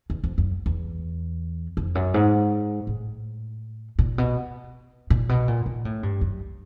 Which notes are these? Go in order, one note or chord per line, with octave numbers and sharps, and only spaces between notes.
E2
F2
F#2
E2
F2
F#2
G#2
A2
A#2
B2
A#2
B2
A#2
A#2
A2
G2
F#2